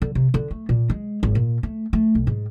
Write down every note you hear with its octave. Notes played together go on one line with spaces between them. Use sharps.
D3
C3
D3
A3
A#2
G#3
G#1
A#2
A3
A3
B1
G#2